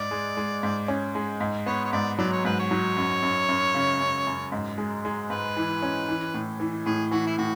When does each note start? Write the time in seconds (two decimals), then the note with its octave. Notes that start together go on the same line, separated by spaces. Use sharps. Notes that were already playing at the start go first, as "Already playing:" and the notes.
Already playing: G#2 D5
0.11 G#3
0.37 G#3
0.63 G#2
0.88 C#4
1.15 G#3
1.41 G#2
1.66 B3 C#5
1.85 C#5
1.93 G#2 D5
2.18 F#3 D5
2.32 C#5
2.45 G#2 B4
2.60 C#5
2.71 F#3
2.97 F#2
3.22 F#2
3.49 F#2
3.74 C#3
4.00 F#2
4.27 F#2
4.52 G#2
4.78 G#3
5.05 G#3
5.30 G#2 B4
5.57 E3
5.82 C#4
6.08 E3
6.34 A2
6.60 E3
6.86 A2 G#4
7.11 E3 F#4
7.27 E4
7.38 A2 F#4